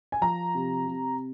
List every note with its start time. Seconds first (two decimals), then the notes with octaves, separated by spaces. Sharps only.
0.12 G#5
0.21 F3 A#5
0.55 C3
0.87 C3